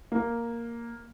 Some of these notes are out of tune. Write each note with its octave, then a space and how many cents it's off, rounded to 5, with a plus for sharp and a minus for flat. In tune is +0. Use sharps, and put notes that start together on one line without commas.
A#3 +0